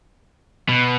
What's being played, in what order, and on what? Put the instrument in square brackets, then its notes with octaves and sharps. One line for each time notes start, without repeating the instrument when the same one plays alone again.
[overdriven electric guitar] B2